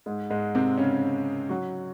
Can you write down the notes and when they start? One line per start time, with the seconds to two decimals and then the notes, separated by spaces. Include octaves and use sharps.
0.06 G#2 G#3
0.30 G#2 G#3
0.55 C3 C4
0.78 C#3 C#4
1.49 F#3 F#4